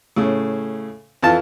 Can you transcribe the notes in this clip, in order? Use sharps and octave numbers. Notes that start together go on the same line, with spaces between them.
A2 C#3
F2 E3 F4 A5